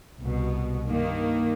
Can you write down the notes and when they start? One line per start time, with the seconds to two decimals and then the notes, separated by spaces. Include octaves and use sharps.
0.20 C2 B2
0.88 G2 D#3 A#3